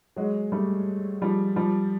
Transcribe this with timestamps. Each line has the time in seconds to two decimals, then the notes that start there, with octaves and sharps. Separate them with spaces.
0.17 F#3 G#3
0.52 G3 A3
1.22 F3 G3
1.56 F3 G3